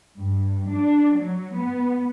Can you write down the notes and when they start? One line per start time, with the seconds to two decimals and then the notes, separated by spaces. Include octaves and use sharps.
0.18 G2
0.69 D4
1.18 F#3
1.57 B3